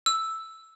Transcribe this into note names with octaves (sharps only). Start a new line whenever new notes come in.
E6